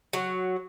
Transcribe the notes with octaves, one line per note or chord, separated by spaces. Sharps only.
F#3